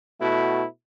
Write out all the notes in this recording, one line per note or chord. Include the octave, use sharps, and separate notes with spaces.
B2 A3 E4 F#4